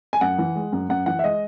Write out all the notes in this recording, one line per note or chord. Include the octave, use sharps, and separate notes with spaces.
G#5
F#2 F#5
E3
G#3
F#2
F#2 F#5
E3 F#5
E5
G#3 D#5